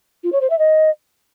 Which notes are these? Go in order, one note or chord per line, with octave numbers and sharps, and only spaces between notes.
F4
C#5
C5
E5
D#5